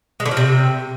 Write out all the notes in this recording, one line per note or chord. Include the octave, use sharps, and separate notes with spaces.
G#3
D3
F3
C3